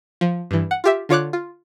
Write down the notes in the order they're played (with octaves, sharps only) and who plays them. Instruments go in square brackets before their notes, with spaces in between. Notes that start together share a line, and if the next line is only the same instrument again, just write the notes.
[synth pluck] F3
G2 E3
F#5
F4 G4 E5
D3 F4 C#5 D6 F#6
F4